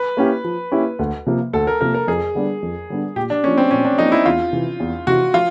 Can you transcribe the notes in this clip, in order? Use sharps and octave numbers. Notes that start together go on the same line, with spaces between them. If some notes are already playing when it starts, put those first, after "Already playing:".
Already playing: B4
A#3 C#4 E4 G4
F3
A#3 C#4 E4 G4
D2
C3 F3 A#3
D2 A4
A#4
C3 F3 A#3 A#4
A#4
F2 G#4
D3 G3 B3 D4
F2
D3 G3 B3 D4
A#2 G4
D4
F3 A#3 C#4
C4
A#2 C#4
D4
F3 A#3 D#4
E4
E2 F4
C3 E3
E2
C3 E3 F#4
F3 F4